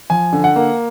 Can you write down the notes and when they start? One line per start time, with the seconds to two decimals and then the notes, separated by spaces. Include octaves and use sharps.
0.10 F3 G#5
0.33 D3
0.44 F#5
0.56 A#3